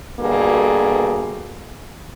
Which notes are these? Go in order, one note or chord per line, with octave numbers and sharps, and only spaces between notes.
D2 G2 B2 D3 A#3 G#4